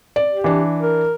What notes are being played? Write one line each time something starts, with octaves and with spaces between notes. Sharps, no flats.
D5
G4
E3 D4
A#4